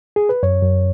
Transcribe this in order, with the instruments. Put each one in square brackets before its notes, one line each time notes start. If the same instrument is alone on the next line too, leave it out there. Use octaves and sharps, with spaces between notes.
[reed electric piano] G#4
B4
F#2 C#5
F#2